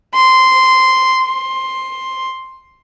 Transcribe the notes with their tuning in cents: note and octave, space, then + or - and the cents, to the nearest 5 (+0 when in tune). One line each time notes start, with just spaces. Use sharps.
C6 -10
C6 +10